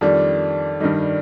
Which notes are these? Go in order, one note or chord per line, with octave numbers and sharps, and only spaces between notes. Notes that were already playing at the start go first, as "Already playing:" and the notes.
F2 D#3 G3 D4
G2 D#3 G3 D#4